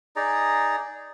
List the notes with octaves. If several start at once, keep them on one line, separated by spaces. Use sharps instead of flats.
D#4 G#4 D5 A#5